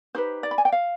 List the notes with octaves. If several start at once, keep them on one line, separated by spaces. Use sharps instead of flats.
D#4 G4 B4 C5
D5
B5
G#5
G5
F5